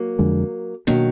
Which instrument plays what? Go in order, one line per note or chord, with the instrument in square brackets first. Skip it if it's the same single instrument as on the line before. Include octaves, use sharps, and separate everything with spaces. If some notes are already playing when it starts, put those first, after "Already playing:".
Already playing: [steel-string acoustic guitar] F#3 A#3
[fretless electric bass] F2 D3 G#3
[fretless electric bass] B2 A#3 D4 [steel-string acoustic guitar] D#3 F#3